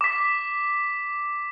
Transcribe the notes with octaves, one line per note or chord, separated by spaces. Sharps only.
D6 B6